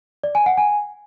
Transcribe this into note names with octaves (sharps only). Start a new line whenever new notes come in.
D5
G#5
F#5
G#5